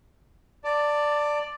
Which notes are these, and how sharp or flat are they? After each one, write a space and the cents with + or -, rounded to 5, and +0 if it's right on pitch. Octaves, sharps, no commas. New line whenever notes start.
D5 +5 A5 +25